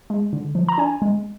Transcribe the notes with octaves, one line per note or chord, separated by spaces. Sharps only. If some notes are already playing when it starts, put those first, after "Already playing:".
G#3
D3
F3
A#5
D4 G#5
G#3